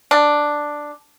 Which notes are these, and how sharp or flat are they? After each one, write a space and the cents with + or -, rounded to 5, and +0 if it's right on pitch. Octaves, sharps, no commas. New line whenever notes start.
D4 +5